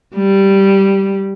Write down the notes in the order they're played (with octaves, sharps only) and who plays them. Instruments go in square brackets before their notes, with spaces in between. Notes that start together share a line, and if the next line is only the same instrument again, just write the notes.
[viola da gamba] G3